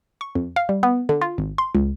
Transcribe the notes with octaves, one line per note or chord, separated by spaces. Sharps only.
C#6
F2
F5
G3
B3
D3
F4
G#1
C6
C#2